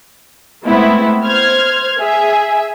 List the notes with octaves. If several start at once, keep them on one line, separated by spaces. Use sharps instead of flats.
G#3 A3 B3 C4 E4
C5 F6 G#6
G#4 E5 G#5